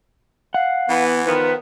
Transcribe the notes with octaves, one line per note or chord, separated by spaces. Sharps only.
F5 F#5
E3 B3
D#3 F3 B3 B4